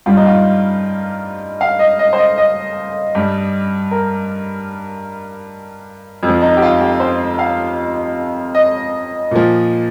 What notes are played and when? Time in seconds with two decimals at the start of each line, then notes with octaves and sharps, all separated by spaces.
0.06 G2 G3 F4
0.17 D#4
0.26 F4
1.61 F5
1.79 D#5
1.99 D#5
2.13 C5
2.18 D#5
2.38 D#5
3.15 G2 G3
3.91 A#4
6.23 F2
6.28 F3
6.42 D#4
6.57 G4
6.62 F4
6.81 G4
7.00 C5
7.39 F5
8.55 D#5
9.31 A#2 F3